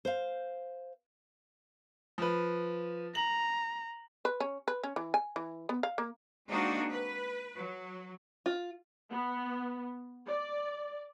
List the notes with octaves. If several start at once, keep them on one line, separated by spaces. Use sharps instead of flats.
C5 F5
F3 B4
A#5 F#7
B4
C#4
B4
C#4
E3
G#5
E3
B3
F5
A#3
G#3 A#3 C4 D4 D#4 F#4
B4
F#3
F4
B3
D5